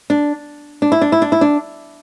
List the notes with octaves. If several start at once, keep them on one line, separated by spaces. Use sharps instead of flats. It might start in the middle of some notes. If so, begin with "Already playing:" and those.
D4
D4
E4
D4
E4
D4
E4
D4